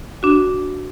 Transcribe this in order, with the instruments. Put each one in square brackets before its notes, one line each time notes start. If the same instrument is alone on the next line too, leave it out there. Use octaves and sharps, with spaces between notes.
[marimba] D4 F#4